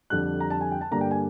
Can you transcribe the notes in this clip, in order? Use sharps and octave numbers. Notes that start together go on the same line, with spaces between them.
F2 D3 G3 F#6
A#5
A5
G#5
G5
A5
G2 D3 G3 A#3 A#5
G5
G#5